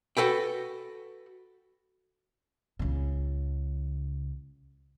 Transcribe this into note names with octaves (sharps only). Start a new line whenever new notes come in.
F#4 A4 B4 G5
C#2 C#3